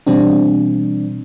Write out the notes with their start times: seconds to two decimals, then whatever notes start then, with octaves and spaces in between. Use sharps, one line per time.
0.07 B2 E3 G3 C4 D4